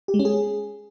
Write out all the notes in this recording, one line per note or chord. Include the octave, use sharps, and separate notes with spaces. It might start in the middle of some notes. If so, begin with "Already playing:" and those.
G4
G#3
C#4
G#4